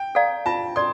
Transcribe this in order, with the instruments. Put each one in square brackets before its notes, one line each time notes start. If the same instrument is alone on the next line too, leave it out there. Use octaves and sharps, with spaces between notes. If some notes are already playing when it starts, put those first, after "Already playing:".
Already playing: [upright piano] G5
[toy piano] A4 D5 F5 A#5
[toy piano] F4 [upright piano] A5
[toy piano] A4 D5 [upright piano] C6